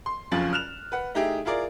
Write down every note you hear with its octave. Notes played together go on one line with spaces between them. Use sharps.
C6
F#1 F2 C#4 F4 A6 F#7
F6 F#6 E7 F7
B4 F#5
A3 D#4 E4 G4 G#4
E4 F4 G#4 A#4 D5